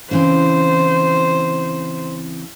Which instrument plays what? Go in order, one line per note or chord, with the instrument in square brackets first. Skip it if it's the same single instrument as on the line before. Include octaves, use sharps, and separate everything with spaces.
[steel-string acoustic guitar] C#3 E3 C4 [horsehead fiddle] C5